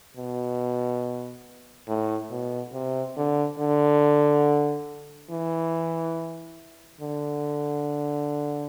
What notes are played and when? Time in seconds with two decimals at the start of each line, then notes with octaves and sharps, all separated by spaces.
0.17 B2
1.88 A2
2.31 B2
2.73 C3
3.17 D3
3.59 D3
5.30 E3
7.01 D3